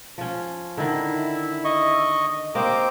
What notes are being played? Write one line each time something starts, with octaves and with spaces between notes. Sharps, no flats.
F3 C#4
D3 D#3 E4
D#5 C#6
A#3 C4 G4 C5 D#5 A#5 D6